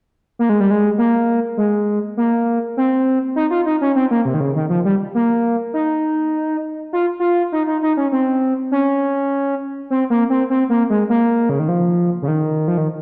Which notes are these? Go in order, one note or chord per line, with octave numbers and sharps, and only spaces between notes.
A#3
G#3
G3
G#3
A#3
G#3
A#3
C4
D#4
F4
D#4
C#4
C4
A#3
C3
D#3
C#3
D#3
F3
G3
A#3
D#4
F4
F4
D#4
D#4
D#4
C#4
C4
C#4
C4
A#3
C4
C4
A#3
G#3
A#3
C#3
D#3
F3
C#3
D#3
F3
D#3